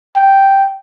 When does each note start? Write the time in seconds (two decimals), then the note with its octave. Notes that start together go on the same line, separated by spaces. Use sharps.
0.16 G5